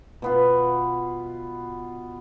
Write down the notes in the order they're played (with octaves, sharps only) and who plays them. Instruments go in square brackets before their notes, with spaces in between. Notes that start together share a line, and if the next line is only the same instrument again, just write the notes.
[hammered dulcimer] B2 B3 F4